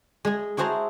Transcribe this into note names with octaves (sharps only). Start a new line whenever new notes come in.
G#3 G#4
E4 F#4 G#4 C5 A5 A#5